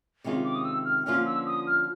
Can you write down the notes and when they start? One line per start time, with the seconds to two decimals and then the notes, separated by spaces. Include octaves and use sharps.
0.24 C3 D#3 G#3 C#4 F4
0.45 D6
0.55 D#6
0.65 E6
0.85 F6
1.05 D3 F3 A#3 C#4 F4 F6
1.25 E6
1.46 D#6
1.67 F6